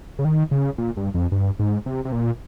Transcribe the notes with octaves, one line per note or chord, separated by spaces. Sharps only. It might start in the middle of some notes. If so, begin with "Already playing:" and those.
C#3
D#3
C#3
A#2
G2
F2
G2
G#2
C3
C3
A#2